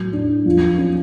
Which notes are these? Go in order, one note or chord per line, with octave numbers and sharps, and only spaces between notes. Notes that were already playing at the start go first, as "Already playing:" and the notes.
Already playing: A2 F#3
D4
F3
C#4